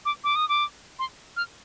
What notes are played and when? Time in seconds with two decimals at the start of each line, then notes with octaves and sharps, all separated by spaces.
0.05 D6
0.24 D6
0.36 D#6
0.49 D6
0.99 C6
1.37 F6